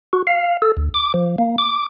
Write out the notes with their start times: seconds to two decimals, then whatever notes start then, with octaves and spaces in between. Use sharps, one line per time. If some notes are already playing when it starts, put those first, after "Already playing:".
0.13 F#4
0.27 F5
0.62 A4
0.77 D2
0.94 D6
1.14 F3
1.38 A#3
1.58 D6